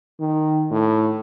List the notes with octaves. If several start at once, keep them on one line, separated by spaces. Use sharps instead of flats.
D#3
A2